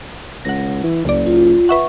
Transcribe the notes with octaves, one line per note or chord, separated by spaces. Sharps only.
C#2 F#5 A#6
E3
F#1 C#2 D5
F4
B4 E5 F#5 C#6